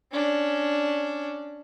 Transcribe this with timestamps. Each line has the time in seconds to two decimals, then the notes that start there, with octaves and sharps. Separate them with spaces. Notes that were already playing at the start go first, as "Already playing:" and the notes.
0.12 C#4 D4